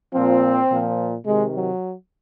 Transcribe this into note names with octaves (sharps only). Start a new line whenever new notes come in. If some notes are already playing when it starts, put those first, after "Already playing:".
A#2 F3 C4
A#2 F3
C3 D#3 G#3
F#3